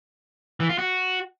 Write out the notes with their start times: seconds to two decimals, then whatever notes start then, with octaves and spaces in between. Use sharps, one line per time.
0.60 E3
0.69 F4
0.78 F#4